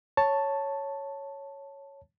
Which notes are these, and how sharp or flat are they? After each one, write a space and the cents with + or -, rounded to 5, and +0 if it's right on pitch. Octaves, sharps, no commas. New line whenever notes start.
C#5 +0 A5 +5